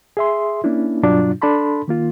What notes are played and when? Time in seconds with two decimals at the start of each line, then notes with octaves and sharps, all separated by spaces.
0.17 G#4 E5 C6
0.64 A#3 C#4 D4 E4
1.03 G2 B2 F#3 D4 F4
1.42 D4 A4 A5 B5 C6
1.88 D#3 A#3 F4